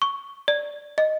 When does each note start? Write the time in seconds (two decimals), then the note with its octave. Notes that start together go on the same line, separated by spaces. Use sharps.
0.02 C#6
0.48 D5
0.98 D#5